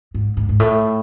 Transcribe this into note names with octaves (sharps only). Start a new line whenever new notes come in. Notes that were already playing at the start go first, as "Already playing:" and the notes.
G#2
G#2
G#2
A2